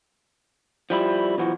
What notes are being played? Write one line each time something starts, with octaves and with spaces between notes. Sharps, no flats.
F3 G3 E4
B1 E3 F3 F#4